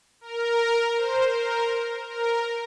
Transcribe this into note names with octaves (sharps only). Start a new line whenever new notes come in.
A#4
C5
A#4
A#4